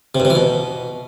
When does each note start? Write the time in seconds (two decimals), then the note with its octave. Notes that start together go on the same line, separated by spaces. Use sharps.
0.15 C3
0.20 G2
0.25 C3
0.30 E3
0.35 B2